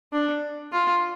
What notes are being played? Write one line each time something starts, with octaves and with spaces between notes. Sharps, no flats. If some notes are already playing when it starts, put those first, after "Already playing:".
D4
F4